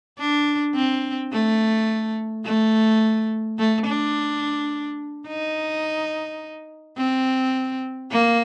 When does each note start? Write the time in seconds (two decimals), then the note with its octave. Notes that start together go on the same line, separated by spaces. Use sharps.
0.19 D4
0.75 C4
1.33 A3
2.45 A3
3.59 A3
3.87 D4
5.28 D#4
6.97 C4
8.11 A#3